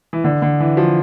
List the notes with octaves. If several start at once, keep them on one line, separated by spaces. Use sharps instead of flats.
E3
D3
D3
E3
F3